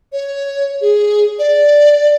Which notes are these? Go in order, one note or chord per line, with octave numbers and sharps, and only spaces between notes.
C#5
G#4
D5